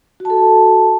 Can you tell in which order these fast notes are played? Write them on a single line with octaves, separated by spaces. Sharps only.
F#4 A5 A4